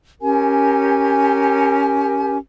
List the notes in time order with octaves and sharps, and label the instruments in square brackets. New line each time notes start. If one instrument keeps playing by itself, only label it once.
[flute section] C#4 G4 A#4 G#5